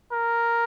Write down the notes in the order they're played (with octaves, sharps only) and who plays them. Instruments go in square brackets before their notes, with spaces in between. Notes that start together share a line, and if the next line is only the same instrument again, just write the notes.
[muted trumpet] A#4